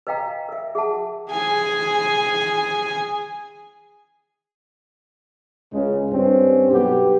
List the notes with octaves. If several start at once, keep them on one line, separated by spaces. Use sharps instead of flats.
B4 D#5 F5 G5 A#5
A#4 E5
G#4 E5 F#5 A5
G#4 G#5
C#2 C#3 G#3
G2 C4 C#4
B1 B3 G4